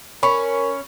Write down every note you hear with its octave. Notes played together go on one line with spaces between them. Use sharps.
C#4 A#4 B5 C#6